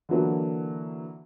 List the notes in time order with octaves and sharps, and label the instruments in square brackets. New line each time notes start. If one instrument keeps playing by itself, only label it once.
[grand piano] D3 E3 F#3 A#3